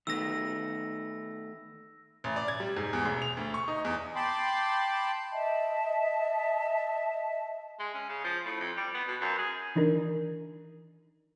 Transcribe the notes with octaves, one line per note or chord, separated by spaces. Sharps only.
D#3 A3 B3 E6 A#6
A1
D5
G#6
G3
G#2
E2
E1
F7
D2
C#6
D#4
E2
G5 A5 B5 C6 D6
D#5 E5 A5
G#3
C#4
C#3
F3
A2
F2
G3
B3
B2
F#2
G#4
D#3 E3 D4 D#4 A#4